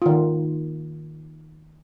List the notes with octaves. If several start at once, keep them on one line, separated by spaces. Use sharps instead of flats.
D#3 F4